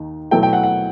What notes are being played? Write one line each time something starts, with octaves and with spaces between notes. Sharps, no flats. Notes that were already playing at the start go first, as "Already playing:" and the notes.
Already playing: D#2 D#3 D#4
B2 F#3 A3 E4 G5
G5
F#5
F#5